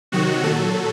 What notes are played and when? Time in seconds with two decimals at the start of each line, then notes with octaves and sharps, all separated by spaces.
0.12 C3 D#3 F#3 F#4
0.43 A#2 F#3 A4